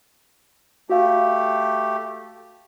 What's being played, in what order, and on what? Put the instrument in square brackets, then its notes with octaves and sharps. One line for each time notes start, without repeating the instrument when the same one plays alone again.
[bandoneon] A3 G4 [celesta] F#4 F5